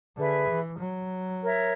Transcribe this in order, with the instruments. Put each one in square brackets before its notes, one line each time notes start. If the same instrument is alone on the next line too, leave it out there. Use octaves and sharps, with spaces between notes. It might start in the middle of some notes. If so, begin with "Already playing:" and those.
[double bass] D3 [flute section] G#4 B4 E5
[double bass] E3
F#3
[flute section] A#4 C#5 E5